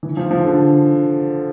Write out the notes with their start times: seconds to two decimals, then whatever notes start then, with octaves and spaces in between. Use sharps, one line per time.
0.03 E3
0.17 F3
0.31 F3
0.45 D3